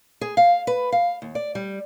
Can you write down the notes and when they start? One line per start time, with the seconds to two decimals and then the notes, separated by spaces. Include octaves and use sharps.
0.21 G#4
0.37 F5
0.67 B4
0.92 F5
1.22 D#2
1.35 D5
1.55 G3